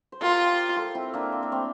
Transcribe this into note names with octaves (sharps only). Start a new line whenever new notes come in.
C5
F4 G4 A#4
F4 A4
C4 E4
A#3 D4
C4
A#3
A3 C4